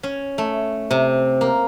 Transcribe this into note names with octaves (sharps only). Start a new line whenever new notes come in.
C#4
A3
C3
A#3